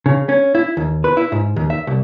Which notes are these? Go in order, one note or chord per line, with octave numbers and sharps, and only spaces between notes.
C#3
C#4
E4
D#2
B4
E4
G#2
D#2
E5
C2